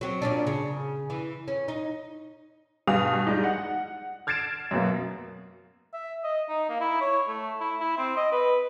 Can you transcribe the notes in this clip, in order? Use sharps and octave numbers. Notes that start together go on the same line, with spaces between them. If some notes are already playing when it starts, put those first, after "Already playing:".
F#3 C4 C#4
A#2 C#4 D4
C#3
E3
C#4
D#4
G2 B2 G#4 F5 D#6 F7
G3 G#3 D#4
F#5
F6 G#6 A6 C7 D7 E7
F#2 B2 A#3
E5
D#5
D#4
A#3
E4
C#5
A3
E4
E4
C4
D#5
B4